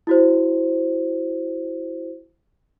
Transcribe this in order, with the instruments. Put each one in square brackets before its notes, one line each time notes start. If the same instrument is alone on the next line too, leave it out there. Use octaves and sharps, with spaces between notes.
[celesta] E4 F#4 C5